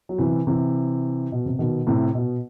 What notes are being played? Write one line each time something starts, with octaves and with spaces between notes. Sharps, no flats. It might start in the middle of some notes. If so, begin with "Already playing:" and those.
F#3
C3 E3
C3 E3
B2
C3
B2 D#3
A2 C3
B2